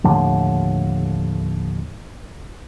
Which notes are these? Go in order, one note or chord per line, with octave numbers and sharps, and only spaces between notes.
D#2 A2 D3 F3